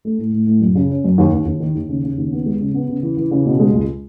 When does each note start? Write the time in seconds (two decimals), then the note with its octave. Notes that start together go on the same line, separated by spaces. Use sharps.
0.05 A3
0.18 A2
0.33 A2
0.47 A2
0.61 F#2
0.75 C#3
0.90 C#4
1.04 F#2
1.18 D#2
1.33 D#2
1.46 D#2
1.60 D#3
1.75 D#2
1.89 C#3
2.04 C#3
2.17 D#2
2.32 B3
2.46 G#3
2.60 C#3
2.74 B3
2.89 C#3
3.03 E3
3.17 E3
3.31 C#3
3.46 B2
3.60 G#3
3.74 C#2